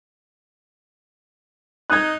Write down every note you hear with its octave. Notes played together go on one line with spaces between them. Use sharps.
D#4 F#6 G#6